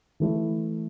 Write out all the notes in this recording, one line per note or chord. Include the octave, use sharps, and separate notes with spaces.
E3 A3 E4 A4